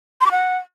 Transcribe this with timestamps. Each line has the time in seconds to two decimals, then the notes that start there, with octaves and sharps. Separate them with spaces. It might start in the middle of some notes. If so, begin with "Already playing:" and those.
0.21 C6
0.26 D6
0.31 F#5